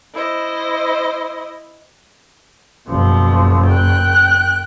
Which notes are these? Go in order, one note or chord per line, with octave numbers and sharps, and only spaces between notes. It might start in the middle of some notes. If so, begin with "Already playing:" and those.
E4 C5 D#5
F#1 B2 F3
G5 F#6